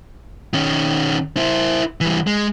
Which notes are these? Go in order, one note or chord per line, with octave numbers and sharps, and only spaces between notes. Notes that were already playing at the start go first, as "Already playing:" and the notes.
D#3 C#4
E4 C5
E3 G3
G#3